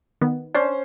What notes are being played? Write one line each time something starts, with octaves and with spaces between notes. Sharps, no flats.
D#3 B3
C#4 D4 C5